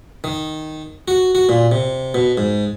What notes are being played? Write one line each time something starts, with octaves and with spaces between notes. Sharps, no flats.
D#3
F#4
F#4
A#2
C3
B2
G#2